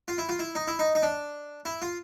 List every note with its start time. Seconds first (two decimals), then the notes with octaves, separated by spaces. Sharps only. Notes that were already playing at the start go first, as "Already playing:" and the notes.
0.08 F4
0.18 E4
0.29 F4
0.39 E4
0.55 D#4
0.68 E4
0.79 D#4
0.95 D#4
1.02 D4
1.65 E4
1.82 F4